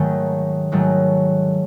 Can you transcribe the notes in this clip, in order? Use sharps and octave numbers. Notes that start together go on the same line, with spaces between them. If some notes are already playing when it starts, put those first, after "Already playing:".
Already playing: G#2 D#3 F#3 A3
G#2 D#3 F#3 A3